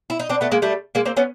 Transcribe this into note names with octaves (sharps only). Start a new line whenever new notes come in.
E4
D#4
C4 D4
A3 B3
G#3 A#3
G3 A3
G#3 A#3
A#3 C4
B3 C#4